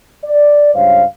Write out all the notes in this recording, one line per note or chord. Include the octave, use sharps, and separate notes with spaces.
D5
C#2 G2 C5 C#5 F5